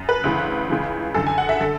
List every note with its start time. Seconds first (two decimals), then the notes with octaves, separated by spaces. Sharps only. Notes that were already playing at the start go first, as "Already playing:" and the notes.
Already playing: F#2
0.09 B4
0.24 D2 C#3 E3
0.69 C#2 C#3 E3
1.14 F#2 D3 A4
1.27 G#5
1.38 F#5
1.49 E5
1.61 D3 A4